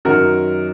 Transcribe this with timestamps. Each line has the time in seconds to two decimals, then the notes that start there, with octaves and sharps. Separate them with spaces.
0.05 F#2 D#3 F#3 F#4 A#4